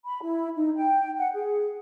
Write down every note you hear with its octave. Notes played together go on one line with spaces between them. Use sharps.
B5
E4
D#4
G5
F#5
G#4